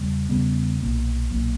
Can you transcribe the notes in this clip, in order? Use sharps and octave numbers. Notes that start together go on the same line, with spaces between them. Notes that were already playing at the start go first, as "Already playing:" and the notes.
Already playing: E2 C#3 G3
E2 C#3 G3 B3
B1 A#2 F#3 A#3
B1 A#2 F#3 A#3